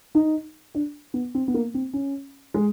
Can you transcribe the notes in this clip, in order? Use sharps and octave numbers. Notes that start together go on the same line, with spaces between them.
D#4
D4
B3
C4
B3
A#3
C4
C#4
G#3